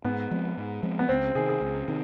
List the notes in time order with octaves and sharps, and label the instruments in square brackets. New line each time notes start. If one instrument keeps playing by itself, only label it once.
[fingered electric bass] G#2 [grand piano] B3
[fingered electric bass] F3 G#3 C4
G#2
F3 G#3 C4
[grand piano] B3
[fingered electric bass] C#2 [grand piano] C4
[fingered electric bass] C3 D#3 [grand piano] G#4
[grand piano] G#4
[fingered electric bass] C#2
C3 D#3